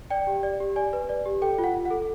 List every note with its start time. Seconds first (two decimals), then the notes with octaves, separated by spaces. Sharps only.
0.10 D5 G5
0.27 G4
0.43 D5
0.60 G4
0.76 D5 G#5
0.93 B4
1.09 D5
1.25 G4
1.41 A4 G5
1.58 F4
1.64 F#5
1.74 F4
1.85 F#5
1.90 A4